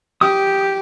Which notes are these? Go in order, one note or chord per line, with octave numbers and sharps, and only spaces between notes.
G4 D#6